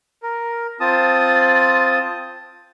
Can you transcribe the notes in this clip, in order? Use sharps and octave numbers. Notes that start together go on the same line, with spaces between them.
A#4
C4 F4 A5 D#6